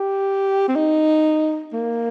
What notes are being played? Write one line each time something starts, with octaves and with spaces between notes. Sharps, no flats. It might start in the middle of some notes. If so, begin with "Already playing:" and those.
Already playing: G4
C4
D#4
A#3